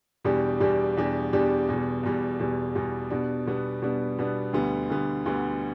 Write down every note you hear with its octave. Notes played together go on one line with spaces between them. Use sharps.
E2 B2 G3 D4 G4
E2 B2 G3 D4 G4
E2 B2 G3 D4 G4
E2 B2 G3 D4 G4
E2 B2 G3
E2 B2 G3
E2 B2 G3
E2 B2 G3
B2 G3 B3 D4
B2 G3 B3 D4
B2 G3 B3 D4
B2 G3 B3 D4
D2 D3 G3 B3
D2 D3 G3 B3
D2 D3 G3 B3